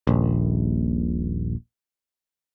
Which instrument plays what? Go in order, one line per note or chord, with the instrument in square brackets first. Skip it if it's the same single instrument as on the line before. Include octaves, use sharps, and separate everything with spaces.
[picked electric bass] D#1 A#1